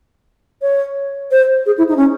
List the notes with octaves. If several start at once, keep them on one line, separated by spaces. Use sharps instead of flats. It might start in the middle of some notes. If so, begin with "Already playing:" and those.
C#5
C5
G#4
E4
D#4
C#4